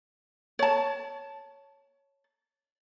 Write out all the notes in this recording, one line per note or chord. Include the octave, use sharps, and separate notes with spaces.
C#5 A5